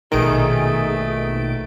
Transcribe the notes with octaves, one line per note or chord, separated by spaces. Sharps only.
A#1 B2 D#3 A3 G#4 D7